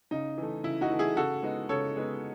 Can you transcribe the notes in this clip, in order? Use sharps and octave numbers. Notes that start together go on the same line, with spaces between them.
C#3 D#4
E3 A3
C#3 E4
D#4 F#4
E3 A3
E4 G#4
C#3 F#4 A4
G#3 B3 D#4
C#3 A4 C#5
G#3 B3 D#4